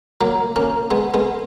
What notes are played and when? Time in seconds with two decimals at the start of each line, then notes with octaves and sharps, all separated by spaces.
0.21 F#3 A#3
0.56 A#3 C#4
0.91 G#3 B3
1.14 G#3 B3